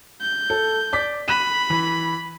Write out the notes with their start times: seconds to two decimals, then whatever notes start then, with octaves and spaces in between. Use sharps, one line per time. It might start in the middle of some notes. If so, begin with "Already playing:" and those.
0.21 G6
0.50 A4
0.93 D5 D6 B6
1.28 B5 F#6 D#7 E7
1.70 E3